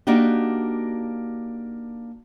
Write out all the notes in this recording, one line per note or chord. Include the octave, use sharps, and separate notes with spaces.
A#3 D4 D#4 F#4 G4